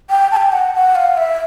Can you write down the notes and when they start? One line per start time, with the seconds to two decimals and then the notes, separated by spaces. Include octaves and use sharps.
0.10 G5
0.32 A5
0.36 G5
0.52 F#5
0.74 F#5
0.96 F5
1.17 E5